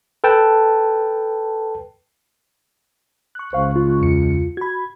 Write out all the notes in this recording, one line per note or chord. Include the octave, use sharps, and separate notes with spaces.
A4 B4 G5 A5
C#6 F#6
C#2 C5 F5
F4
E2 C#7
F#4 B5 G#6